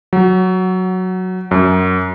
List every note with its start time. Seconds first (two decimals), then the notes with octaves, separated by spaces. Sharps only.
0.13 F#3
1.51 F#2